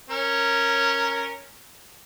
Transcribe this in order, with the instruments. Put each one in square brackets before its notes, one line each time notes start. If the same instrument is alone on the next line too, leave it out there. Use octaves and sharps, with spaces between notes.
[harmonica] C#4 A#4